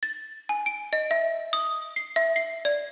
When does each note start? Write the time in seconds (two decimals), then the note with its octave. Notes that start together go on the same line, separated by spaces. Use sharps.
0.03 A6
0.49 G#5
0.66 D7
0.93 D#5
1.11 E5
1.53 D#6
1.96 C7
2.16 E5
2.36 C7
2.65 D5